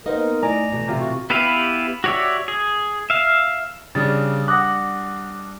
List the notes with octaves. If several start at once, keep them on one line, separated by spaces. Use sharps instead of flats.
A#3 B3 D#4 A#4 C5 D#5
A2 D5 G#5 A#5 D6
B2 E3 A3
C3 F4
F#4
B3 E4 G4 B4 F5
F#4 G4 C#5 D5 E5
G#4
E5 F5
C#3 G3 D4 A6
F#5 D6 D#6 F#6 A#6